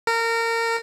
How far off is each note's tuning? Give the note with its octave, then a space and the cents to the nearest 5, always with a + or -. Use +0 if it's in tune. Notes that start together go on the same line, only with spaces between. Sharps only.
A#4 -25